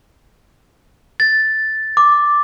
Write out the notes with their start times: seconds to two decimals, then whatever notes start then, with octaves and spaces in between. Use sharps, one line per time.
1.20 A6
1.97 D6